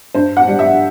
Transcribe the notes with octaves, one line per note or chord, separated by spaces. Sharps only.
G2 C5
F#5
G3
E5